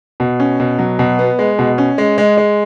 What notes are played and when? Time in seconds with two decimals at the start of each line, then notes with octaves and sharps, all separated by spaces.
0.20 B2
0.40 C#4
0.60 B2
0.79 F#3
0.99 B2
1.19 B3
1.39 G#3
1.59 B2
1.78 C#4
1.98 G#3
2.18 G#3
2.37 G#3